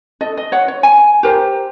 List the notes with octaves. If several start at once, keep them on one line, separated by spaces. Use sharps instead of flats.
A4 D#5
D#5
C#5 F#5
C#5
G#5
G4 A#4 C5